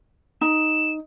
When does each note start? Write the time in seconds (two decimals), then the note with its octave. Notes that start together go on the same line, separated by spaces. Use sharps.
0.41 D#4 E7